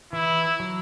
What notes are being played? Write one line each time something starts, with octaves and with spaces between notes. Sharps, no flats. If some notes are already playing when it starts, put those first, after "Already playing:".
E3 E4
F#3